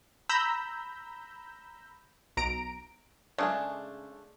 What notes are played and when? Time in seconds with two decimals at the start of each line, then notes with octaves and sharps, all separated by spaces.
0.29 A#5 B5 E6 G6
2.37 B1 A#5 D7
3.38 C#3 G#3 A3 D4